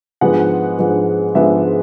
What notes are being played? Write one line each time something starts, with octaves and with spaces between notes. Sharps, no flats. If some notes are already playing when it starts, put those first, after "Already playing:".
G#2 F3 G#3 B3 D4 F#5
G#2 F3 G#3 B3 D4
G#2 F3 G#3 B3 D4 E5